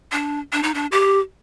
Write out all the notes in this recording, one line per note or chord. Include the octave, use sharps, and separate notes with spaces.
D4
D4
D#4
D4
G4